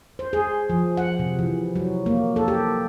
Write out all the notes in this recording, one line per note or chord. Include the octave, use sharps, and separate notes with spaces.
C5
G#4
F3
F#5
C3
E3
F#3
A#3
A4
G4